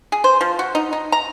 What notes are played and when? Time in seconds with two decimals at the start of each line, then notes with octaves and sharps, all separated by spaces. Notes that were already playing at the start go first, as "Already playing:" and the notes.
0.12 G#4
0.24 C5
0.41 F3
0.59 F#4
0.75 D#4
0.93 D#4
1.12 A#5